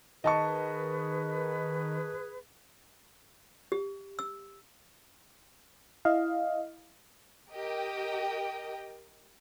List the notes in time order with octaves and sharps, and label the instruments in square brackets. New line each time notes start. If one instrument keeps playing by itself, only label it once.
[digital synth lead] D#3 [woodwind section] G#4 B4 [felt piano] D#5 A5 C#6
[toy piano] G4
E6
[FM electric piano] E4 D#5 F5
[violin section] G4 A#4 D#5 G5